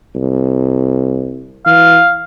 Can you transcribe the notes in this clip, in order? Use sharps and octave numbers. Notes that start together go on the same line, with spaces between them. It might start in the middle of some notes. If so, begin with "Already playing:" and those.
C2
E3 F5